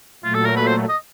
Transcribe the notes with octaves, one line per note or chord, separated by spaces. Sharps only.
A#2 F#3 A3 F4
A4
A#4
B4
C5
D#5